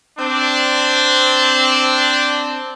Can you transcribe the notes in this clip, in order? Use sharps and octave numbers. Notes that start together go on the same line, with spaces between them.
C4 D4